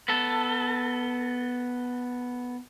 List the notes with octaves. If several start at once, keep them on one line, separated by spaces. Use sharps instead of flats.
B3 A4